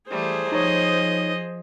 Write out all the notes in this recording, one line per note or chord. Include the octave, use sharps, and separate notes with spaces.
E3 G3 A3 G#4 C5
F3 D#4 C#5 D#5